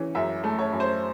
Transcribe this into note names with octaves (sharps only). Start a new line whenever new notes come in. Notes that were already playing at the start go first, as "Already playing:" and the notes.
Already playing: E3 C#4
F#2 E5
A3
C#5
F#2
C5